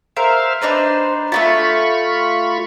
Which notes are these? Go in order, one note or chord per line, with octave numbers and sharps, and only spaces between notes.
A#4 C5 E5 F5
D4 D#4 B4 C5
A3 B3 F4 A5 B5 C#6